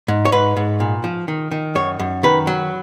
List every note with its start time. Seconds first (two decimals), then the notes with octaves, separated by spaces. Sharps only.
0.08 G#2
0.25 C#5
0.32 G#2 B4
0.57 G#2
0.80 A#2
1.04 F3
1.28 D#3
1.51 D#3
1.75 F#2 C#5
1.99 F#2
2.23 D#3 B4
2.47 F#3